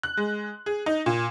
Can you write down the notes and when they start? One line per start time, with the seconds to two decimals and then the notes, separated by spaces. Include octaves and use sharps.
0.03 F#6
0.17 G#3
0.66 G#4
0.86 D#4
1.06 A#2